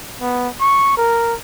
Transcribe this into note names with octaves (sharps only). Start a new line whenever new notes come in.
B3
C#6
A#4